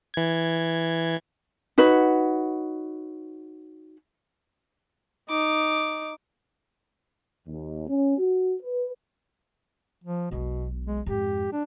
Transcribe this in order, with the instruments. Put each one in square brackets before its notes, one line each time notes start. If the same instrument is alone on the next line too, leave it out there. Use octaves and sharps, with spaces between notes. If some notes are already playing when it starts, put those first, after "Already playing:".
[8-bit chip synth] E3 G#6
[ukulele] D#4 F#4 B4 C#5
[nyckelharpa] D#4 [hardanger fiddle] D6
[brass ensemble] D#2
C#4
F#4
B4
[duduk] F3
[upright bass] E1 B1 [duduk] B2
[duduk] G#3
[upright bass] F2 G#2 [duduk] G4
[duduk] D4